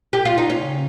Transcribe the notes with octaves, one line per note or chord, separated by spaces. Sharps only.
G4
F4
D#4
C#3 C#4